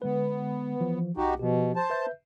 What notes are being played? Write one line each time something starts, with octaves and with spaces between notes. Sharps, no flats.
D3 G#3 B3 B4
E3 F3
B1 D#4 F#4 G4
B2 F3 G4
C5 A5
B4 E5 G6